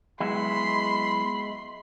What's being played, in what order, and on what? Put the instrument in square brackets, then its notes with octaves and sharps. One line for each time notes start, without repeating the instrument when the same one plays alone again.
[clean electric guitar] F#3 B3 E4 [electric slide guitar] G#3 [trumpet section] B5 [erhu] C6